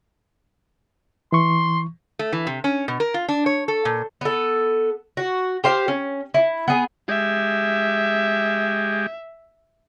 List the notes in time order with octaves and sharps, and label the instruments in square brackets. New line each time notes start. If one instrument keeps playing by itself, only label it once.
[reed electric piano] E3 C#6 [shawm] C6
[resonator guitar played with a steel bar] A3
E3
C3
C#4
B2
A#4
F4
D4
C#5
A4
A#2
[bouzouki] B3 A4
F#4
G4 C5 F5
C#4
E4
B3 G#4
[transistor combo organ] G#3 G4 [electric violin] E5